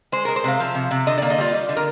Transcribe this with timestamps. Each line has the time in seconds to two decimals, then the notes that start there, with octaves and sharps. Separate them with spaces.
0.12 G#3 C5
0.25 G#3 A#4
0.36 C5
0.44 C3 F5
0.60 F3
0.75 C3
0.91 C3
1.07 D3 D#5
1.17 A#3 D5
1.30 D#5
1.38 G3 F4
1.53 G3
1.69 D3
1.76 A#4